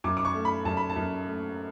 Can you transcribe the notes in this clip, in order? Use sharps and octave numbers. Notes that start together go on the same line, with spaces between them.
F#2 D6
D6
C#6
A3
B5
F#2 A5
B5
A5
F#2
A3